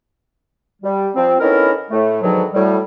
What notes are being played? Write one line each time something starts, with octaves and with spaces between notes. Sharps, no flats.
G3
F3 C4
D3 B3 C#4 D#4 E4 A#4
A2 A3
G#2 B2 D3 D#3 F3 F#3
A2 F#3 G3